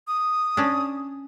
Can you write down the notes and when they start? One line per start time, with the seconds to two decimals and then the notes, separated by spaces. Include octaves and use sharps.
0.08 D#6
0.57 C#4 D4